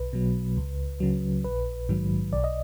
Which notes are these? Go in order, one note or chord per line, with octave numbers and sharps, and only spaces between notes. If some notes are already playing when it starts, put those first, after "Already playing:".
Already playing: B1 B4
B2 F#3
C#2
C#3 F#3
A#1 B4
G#2 D#3 F#3
B1 D5
D#5